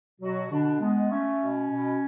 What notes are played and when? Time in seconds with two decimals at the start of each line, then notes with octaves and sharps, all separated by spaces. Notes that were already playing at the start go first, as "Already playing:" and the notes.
0.21 B2 F#3 F#4
0.50 B2 D3 D4
0.80 G#3 B3
1.10 A3 C#4
1.40 B2
1.69 B2